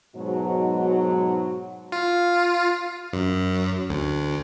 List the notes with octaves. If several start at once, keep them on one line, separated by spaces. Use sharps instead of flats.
G#2 B2 F#3
F4
F#2
D2